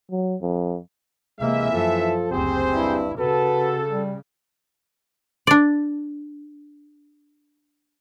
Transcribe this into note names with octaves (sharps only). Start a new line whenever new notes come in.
F#3
F2
C3 E3 G#3 A#3 E5
F#2 F3 A4
F#1 D2 C4 G4 G#4 C5
G2 E4
C#3 F#4 A4 B4
G3
D4 D5